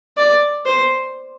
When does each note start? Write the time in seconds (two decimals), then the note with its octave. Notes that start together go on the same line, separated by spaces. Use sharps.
0.17 D5
0.66 C5